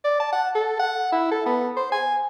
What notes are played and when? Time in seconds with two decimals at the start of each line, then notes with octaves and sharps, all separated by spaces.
0.05 D5
0.20 A5
0.33 F#5
0.55 A4
0.79 F#5
1.12 E4
1.32 A4
1.46 B3
1.77 C5
1.92 G#5